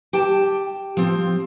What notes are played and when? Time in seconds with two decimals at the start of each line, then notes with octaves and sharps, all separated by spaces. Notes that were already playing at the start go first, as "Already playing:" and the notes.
0.13 G4 G5 A5
0.97 F3 C4